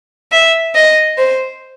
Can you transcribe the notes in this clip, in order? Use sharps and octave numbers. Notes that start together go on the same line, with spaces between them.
E5
D#5
C5